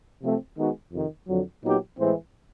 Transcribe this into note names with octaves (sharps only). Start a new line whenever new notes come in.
C3 F3 A3 C4
D#3 G#3 B3 D#4 F#4
F2 C3 D#3
F2 D3 F#3
A#2 F#3 B3 D#4 G4
A2 E3 G#3 C4